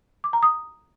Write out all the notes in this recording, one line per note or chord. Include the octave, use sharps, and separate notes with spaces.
D6
A#5
D#6